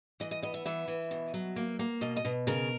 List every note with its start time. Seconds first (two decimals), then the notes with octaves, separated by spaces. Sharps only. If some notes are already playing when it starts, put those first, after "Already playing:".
0.20 E3 D#5
0.31 D#5
0.42 B3 D#5
0.54 E5
0.66 E3 E5
0.88 E3
1.11 B2
1.34 F#3
1.56 A#3
1.79 A#3
2.01 B2 D#5
2.16 D#5
2.25 B2
2.47 C#3 A#4